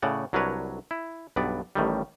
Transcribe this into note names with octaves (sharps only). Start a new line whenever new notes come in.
A2 C#3 D5 F#5
C2 F#3 D4 A#4 B4 C#5
E4
B1 G2 B3 D5
A1 A2 D#3 G3